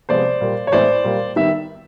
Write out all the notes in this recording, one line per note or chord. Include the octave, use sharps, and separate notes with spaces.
C3 F3 G#3 B3 C5 D5
A#2 G3 A#3
C#5
A2 E3 G#3 B3 C5 D5
A#2 G3 A#3
D#3 G3 B3 E5